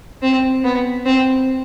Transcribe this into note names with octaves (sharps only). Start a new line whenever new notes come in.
C4
B3
C4